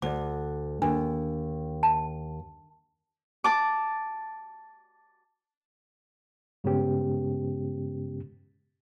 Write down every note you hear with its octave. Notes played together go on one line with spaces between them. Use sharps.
D2 D5 D6
D#2 D4
A5
A5 D6
G2 C#3 G#3 B3 C#4 G4